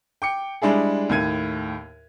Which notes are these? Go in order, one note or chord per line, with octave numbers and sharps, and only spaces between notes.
G5 D6 C#7
G3 G#3 D4 E4 G#4
D#2 A2 G#6 D#7